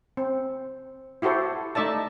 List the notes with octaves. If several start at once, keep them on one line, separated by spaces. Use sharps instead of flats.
C4
E4 F#4 G4 A4 C5
A3 D#4 D5 E5 A5